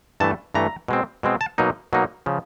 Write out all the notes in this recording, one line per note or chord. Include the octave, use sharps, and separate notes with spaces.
G2 E3 A3 A5
G2 E3 A3 A#5
B2 G#3 C4
B2 G#3 C4
A5
B2 F#3 A#3 D#4
B2 F#3 A#3 D#4
C#3 F3